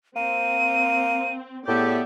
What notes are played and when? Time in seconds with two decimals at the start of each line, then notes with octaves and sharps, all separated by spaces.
0.16 A#3 C4 D#7
1.67 A2 B3 G4 G#4 D5 E5